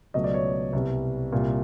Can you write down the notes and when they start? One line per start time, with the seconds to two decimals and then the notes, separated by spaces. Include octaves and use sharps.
0.14 C#2 B2 F#3 A3 D#5
0.24 D5
0.34 C#5
0.73 C2 B2 G3
1.32 C2 A#2 G3